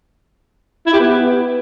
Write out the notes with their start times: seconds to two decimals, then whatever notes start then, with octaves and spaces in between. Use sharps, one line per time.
0.87 E4
0.93 G4
1.00 B3